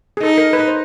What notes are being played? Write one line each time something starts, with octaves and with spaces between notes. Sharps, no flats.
G#4
D#4 A4
A#4
B4
C5